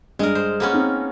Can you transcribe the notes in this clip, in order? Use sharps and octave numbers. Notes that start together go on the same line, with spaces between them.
G2 G#3 A#4
C5
A#3 B3 C#4
C4 D#4 G#4